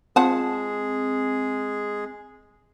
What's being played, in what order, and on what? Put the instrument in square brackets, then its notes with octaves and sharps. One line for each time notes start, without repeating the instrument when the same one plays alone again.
[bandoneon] G#3 G#4 [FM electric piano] C4 [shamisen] F4 F#5 A5